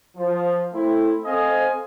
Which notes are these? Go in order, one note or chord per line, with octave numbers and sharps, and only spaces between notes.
F3
A3 C4 E4
C4 A4 C5 D#5 F5 G#5